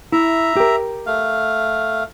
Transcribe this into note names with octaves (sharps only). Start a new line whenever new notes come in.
E4 E5 A#5
G4 A#4
A3 F5